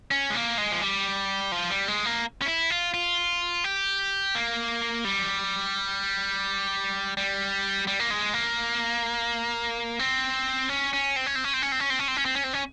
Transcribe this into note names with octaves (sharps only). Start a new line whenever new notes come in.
C#4
G#3
A#3
G#3
F3
G3
F3
G3
G#3
A#3
C#4
E4
F4
F4
G4
A#3
G3
G3
G3
A#3
G#3
A#3
C4
C#4
C#4
C4
C#4
C4
C#4
C4
C#4
C4
C#4
C4
C#4
C4
C#4
C4
C#4
C4
C#4